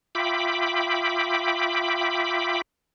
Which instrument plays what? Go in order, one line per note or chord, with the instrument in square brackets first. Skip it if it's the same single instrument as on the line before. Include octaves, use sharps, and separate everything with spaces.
[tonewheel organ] F4 E5 G5 B5 D6